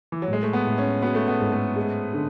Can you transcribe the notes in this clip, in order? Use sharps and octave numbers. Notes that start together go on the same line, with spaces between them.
E3
F#3
A2
G#3
A3
B3
A2
C#4
B3 F#4
A3
B3
G#2
A3
G#3
D3